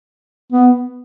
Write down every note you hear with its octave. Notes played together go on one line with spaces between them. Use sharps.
B3